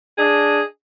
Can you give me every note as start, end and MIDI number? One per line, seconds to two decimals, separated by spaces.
0.17 0.61 62
0.17 0.61 68
0.17 0.61 75